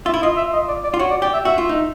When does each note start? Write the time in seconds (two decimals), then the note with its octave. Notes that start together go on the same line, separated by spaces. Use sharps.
0.06 F4 E5
0.14 E4
0.22 F4 D#5
0.37 E5
0.53 D#5
0.68 D5
0.84 D5
0.94 F4
0.99 F#4 C#5
1.10 D5
1.22 G4 D5
1.34 E5
1.45 F#4 E5
1.58 F4
1.69 D#4